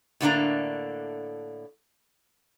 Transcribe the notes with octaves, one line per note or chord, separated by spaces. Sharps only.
A2 D3 A3 A#3 D4 A#5